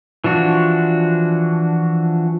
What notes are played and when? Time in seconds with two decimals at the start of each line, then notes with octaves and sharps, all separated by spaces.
0.24 E3 F3 D4 F#4